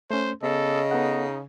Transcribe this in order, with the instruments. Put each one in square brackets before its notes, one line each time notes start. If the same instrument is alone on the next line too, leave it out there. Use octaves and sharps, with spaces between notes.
[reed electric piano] A3 C#4 [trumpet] C5
[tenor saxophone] C#3 [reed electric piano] B3 [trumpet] A4 [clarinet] D#5
[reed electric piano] B3 A4 F#5 [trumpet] D#4